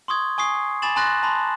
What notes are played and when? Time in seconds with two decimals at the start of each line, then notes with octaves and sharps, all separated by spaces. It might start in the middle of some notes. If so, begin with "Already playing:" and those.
0.08 C6 C#6 D#6 G#6
0.38 G#5 C#6 D#6 C7
0.82 G#5 B5 D6 A6 E7 F#7
0.96 G#5 A#5 C6 F#6 A6 A#6
1.23 A5 B5 C6